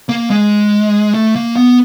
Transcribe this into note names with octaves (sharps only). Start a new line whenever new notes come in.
A#3
G#3
A3
A#3
B3